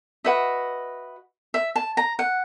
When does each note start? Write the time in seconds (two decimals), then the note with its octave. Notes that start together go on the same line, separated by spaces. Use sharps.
0.24 F#4 B4 D#5 E5
1.54 E5
1.76 A5
1.97 A#5
2.19 F#5